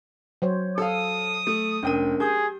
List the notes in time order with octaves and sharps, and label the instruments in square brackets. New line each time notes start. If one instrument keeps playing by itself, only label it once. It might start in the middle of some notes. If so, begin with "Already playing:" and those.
[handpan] F#3 C5 C#5
[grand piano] A4 F5 [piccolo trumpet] D#6
[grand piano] A3
[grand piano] F1 G5 D#7 [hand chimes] C#4 D4 A#4
[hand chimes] G4 [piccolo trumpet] G#4 [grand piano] D#6 G6